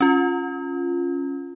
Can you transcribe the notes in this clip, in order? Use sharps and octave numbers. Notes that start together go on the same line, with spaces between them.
C#4 F4